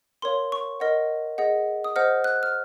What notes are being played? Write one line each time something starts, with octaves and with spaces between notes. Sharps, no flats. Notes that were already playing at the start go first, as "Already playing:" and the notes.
A#4 C#5 F5 C6
C#6
A#4 D#5 F#5
G#4 D#5 F#5
D#6
C5 D#5 F#5 F6
F#6
F6